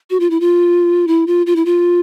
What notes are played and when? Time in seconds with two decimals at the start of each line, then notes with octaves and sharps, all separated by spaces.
0.10 F#4
0.20 F4
0.30 E4
0.40 F4
1.07 E4
1.27 F4
1.46 F4
1.56 E4
1.65 F4